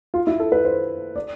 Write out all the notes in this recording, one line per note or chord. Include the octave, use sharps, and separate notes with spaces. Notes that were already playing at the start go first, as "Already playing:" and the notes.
F4
E4
A4
B4
C5
D5